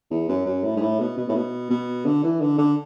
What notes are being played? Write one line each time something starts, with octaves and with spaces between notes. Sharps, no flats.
E2
F#2
F#2
A2
G#2
A2
B2
B2
A2
B2
B2
D3
E3
D3
D3